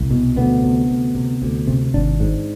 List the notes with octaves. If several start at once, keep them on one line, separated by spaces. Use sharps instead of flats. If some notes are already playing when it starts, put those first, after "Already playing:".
Already playing: C2
B2
D2 B3
C3
D2
C3
D2
C3
G#1 D4
G#2